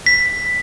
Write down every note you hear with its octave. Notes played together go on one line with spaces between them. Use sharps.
B6